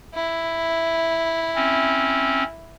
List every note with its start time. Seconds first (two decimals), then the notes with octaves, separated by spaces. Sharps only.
0.14 E4
1.56 C4 C#4